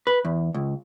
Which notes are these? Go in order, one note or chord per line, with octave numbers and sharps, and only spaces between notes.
B4
E2
C#2